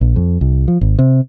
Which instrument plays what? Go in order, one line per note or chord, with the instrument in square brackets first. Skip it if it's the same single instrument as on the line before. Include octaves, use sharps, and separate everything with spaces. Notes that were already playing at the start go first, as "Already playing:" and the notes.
[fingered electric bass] A#1
F2
C2
F3
G#1
C3